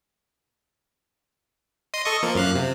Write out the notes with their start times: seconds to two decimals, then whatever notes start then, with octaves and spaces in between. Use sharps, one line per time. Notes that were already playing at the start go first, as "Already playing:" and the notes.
1.94 D#5 C6 D#6
2.05 A4 D#5 C#6
2.23 F3 A#3
2.35 F#2 F5 F#6
2.55 C3